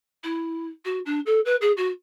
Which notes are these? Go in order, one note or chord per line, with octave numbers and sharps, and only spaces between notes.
E4
F#4
D4
A4
B4
G#4
F#4